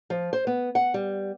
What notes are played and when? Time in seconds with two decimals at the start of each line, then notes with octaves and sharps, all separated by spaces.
0.10 F3
0.33 C5
0.47 B3
0.75 F#5
0.94 G3